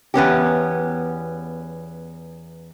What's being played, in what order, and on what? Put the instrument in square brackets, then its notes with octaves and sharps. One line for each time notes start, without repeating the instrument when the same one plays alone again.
[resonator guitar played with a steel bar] E2 B3 C#4 G4